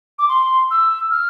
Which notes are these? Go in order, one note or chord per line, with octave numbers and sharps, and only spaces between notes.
D6
C6
E6
F6